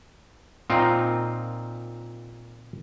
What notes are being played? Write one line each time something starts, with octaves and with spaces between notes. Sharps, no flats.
A#2 C4 D#4 F4